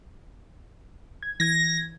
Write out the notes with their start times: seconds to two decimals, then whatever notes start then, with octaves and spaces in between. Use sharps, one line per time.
1.23 G#6
1.40 E3 G#6 A#6